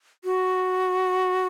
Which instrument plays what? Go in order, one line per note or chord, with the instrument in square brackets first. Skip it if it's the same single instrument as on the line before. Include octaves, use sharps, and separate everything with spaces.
[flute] F#4